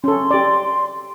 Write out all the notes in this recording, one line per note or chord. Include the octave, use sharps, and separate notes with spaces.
C#4 A4 C6
G4 D5